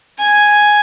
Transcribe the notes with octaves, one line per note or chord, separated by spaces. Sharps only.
G#5